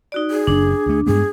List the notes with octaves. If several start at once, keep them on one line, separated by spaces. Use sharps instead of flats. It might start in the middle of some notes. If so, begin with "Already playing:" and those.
D#4 F#4 D5
G#4
F#1 F#2 D4
D2 A3
G2 G#3 B3 G#4